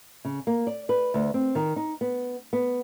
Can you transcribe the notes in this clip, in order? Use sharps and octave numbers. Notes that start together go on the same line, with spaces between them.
C#3
A#3
D5
B4
D2
C4
D#3
D#4
B3
B3